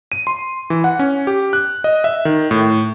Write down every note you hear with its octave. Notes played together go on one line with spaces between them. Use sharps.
D#7
C6
E3
F#5
C#4
G4
F#6
D#5
E5
D#3
A2